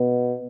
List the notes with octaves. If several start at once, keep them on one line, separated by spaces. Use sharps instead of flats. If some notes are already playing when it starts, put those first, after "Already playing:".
Already playing: B2